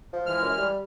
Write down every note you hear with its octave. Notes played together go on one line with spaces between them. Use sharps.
F3
E3 G#3 F6
F#2
G3